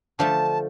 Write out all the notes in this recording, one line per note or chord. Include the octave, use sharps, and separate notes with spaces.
D3 F3 A3 A5